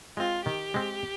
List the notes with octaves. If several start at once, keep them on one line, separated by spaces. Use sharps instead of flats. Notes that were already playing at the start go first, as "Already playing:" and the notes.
G#3 C4 F4
D#3 G4
G#3 C4